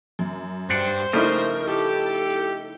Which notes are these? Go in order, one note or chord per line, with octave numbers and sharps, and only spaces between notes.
F#2
G2 D4 G4 C5 F#5
C#3 F3 G3 A3 D#4 E4 A#4
G4 A4